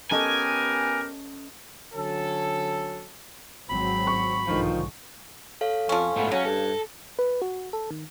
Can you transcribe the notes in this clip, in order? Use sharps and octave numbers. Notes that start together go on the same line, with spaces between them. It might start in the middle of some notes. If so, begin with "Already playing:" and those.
B3 C#4 G4 A4 A#4 D#5 G#5
D3 F#3 C#4 A4
G#1 F#3 C4 B5
C#6
B1 G#2 D3 D#3 F3
A4 C#5 F5
F2 F3 C#4
G#2 A3 B3
C#3 F#3 C#4 A#6
G2 A4
B4
F#4
A4
D#3